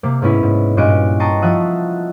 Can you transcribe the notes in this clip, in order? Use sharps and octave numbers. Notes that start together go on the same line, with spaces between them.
C3 A#3
G#2 B3 C#4 E4
G#2
G2 A#2 C#4 F#4 D#5 D7
G5 A5 A#5 C6 C#6 D#6
F3 E5 F#5 D#6